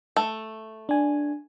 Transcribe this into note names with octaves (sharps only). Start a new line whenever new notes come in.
A3
D4 G#5